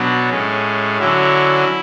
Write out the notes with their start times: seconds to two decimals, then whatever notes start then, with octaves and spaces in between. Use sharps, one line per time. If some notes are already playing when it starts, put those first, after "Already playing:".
Already playing: B2 F#3 B3 D4
0.30 A2 G#3 C#4
0.99 D3 F#3 C#4 E4